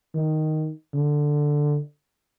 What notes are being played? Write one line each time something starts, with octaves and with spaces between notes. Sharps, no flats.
D#3
D3